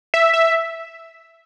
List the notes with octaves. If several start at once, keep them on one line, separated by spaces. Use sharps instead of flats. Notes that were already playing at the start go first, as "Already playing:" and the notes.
E5
E5